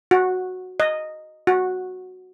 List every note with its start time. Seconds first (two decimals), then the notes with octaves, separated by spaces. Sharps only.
0.11 F#4
0.80 D#5
1.47 F#4